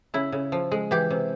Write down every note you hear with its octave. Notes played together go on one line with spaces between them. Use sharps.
C#3 E4
C#3
F3
G#3
E3 G4
C3